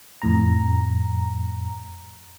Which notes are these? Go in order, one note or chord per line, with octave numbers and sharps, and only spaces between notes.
F2 A2 A#5